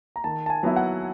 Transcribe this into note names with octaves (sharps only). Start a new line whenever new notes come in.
A#5
D#3 A5
A5
G#5
F#3 B3 E4
F#5